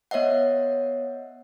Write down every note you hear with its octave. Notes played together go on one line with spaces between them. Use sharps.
B3 C#5 D#5 E5 F#5